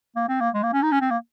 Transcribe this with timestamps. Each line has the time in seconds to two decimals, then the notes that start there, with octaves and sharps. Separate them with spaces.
0.16 A#3
0.29 C4
0.40 A#3
0.54 G#3
0.63 A#3
0.73 C#4
0.82 D#4
0.91 C#4
1.01 C4
1.10 A#3